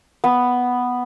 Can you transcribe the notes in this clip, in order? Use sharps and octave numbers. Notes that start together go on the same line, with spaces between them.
B3